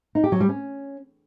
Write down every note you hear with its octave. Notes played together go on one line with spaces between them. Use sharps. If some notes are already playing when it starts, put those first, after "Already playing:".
D#4
G4
F#3
G3
C#4